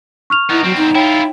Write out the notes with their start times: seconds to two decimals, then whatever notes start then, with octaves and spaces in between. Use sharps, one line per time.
0.30 C#6 F6 F7
0.50 B3 D#4 E4
0.64 E2 F#3 C4
0.77 D#4
0.95 E4 F4 C#5 G5